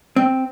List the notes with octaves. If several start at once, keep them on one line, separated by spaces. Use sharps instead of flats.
C4